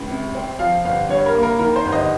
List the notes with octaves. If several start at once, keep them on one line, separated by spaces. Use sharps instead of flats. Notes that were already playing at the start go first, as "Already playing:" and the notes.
Already playing: C#2
C3
C4
F3 F5
G1 F5
G2 C#5
A#4
A#3
A#4
D#3 A#4
C5
G1
D#5